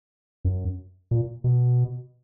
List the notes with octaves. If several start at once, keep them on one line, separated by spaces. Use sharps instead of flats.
F#2
A#2
B2